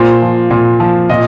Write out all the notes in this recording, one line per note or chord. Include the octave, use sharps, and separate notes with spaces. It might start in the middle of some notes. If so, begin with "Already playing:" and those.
Already playing: A#2 C5
F3
A#2
F3
A#2 D#5